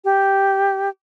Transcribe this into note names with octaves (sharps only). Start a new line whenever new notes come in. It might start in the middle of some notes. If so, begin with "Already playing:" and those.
G4